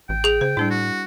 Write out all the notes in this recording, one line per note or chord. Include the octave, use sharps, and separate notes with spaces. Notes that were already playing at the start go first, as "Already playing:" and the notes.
A1 G5
G#4 F7
C#3 C5
A2 G3 D4 E4
F#4